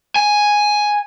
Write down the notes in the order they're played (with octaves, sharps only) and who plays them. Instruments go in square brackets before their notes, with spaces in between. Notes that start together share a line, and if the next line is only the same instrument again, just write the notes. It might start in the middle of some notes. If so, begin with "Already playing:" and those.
[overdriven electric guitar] G#5